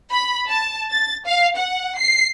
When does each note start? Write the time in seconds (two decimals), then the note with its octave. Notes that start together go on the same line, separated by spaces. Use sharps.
0.11 B5
0.49 A5
0.91 A6
1.26 F5
1.57 F#5
1.98 C7